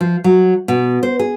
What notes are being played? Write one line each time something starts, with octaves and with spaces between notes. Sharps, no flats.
F3
F#3
B2
C5
G#4